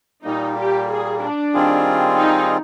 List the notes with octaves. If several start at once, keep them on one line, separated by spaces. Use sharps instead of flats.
A#2 G3 A#3 D#4
G4
G#4
D4
D#3 G3 C4 F4 G#4
D#4